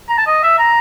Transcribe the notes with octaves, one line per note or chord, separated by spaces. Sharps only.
A#5
A5
D#5
E5
A#5